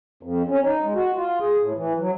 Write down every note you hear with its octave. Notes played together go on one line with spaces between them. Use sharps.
F2
C#4
D#4
G#3
F#4
F4
G#4
A2
E3
F#3